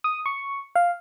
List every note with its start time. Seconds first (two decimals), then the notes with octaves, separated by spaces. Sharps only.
0.04 D#6
0.26 C#6
0.75 F5